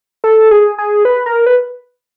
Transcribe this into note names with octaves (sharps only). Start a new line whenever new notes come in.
A4
G#4
G#4
B4
A#4
B4